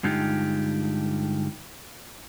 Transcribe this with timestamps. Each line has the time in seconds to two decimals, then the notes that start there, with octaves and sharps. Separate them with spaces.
0.03 G2 D3 G#3 D#4 F4 G4